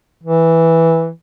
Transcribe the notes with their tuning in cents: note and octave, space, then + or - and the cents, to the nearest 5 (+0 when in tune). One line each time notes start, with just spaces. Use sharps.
E3 -5